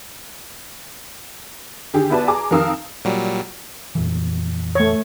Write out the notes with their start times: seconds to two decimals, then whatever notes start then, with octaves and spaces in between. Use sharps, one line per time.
1.94 D3 D#3 G4 G#4
2.10 B3 E4 F#4 B4 D5 A5
2.28 G#4 G#5 A#5 D6
2.51 F2 D#3 A#4 F5 D#6 E6
3.05 A#2 F#3 G3
3.95 F2 A#2 E3
4.75 A3 C#5